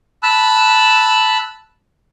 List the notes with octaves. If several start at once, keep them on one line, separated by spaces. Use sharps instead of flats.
A5 B5 E6 F#6